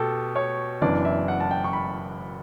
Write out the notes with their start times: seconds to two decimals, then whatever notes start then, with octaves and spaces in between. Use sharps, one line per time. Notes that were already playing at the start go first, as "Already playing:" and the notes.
Already playing: B2 G4 A4
0.36 C#5
0.81 F#1 F#2 E3 B3 D4 D5
1.05 E5
1.28 F#5
1.40 A5
1.51 G5
1.64 C#6
1.73 B5